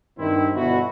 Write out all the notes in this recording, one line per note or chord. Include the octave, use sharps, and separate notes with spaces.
G2 D#3 C4 E4
G1 B2 E4 F#4